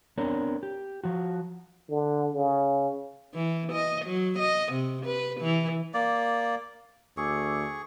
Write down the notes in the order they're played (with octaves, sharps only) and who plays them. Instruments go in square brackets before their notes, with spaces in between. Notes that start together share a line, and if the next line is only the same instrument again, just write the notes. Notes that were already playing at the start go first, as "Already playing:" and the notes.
[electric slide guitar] B3 C4 D4 A#4 C#5
G4
F3 F#4
[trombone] D3
C#3
[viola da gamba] E3
D#5
F#3
D#5
C3
B4
E3
[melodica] A#3 D5
[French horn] D2 [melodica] G#4 C#6 [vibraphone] D6 E6